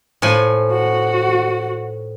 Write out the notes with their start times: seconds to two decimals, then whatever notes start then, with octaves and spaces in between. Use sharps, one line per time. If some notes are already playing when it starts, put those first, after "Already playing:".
0.22 A2 F3 G#5
0.72 F#4